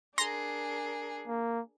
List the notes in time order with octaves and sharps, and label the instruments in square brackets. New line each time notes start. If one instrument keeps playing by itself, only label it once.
[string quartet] D4 G#4 A#4 [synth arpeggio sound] A#5 C6
[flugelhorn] A#3